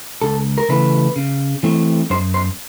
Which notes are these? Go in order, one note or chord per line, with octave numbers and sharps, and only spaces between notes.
C#2 A4
A#4
C#3 E3 A3 B4
C#3
E3 A3 C4
F#2 C5
C5